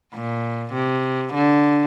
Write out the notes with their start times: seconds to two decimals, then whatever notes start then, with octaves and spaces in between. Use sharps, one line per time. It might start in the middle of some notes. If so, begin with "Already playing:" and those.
0.15 A#2
0.74 C3
1.35 D3